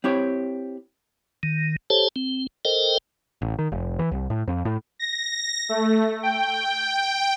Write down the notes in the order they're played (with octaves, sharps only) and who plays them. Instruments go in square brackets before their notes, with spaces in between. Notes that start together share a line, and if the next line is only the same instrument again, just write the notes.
[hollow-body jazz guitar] C4 E4 G4 C#5
[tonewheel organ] D#3
G4 A4 C5 C#5 A5
C4
A4 A#4 C5 D#5 G5
[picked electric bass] A1
D#3
F1
E3
C2
A2
F2
A2
[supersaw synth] A#6
A3
G5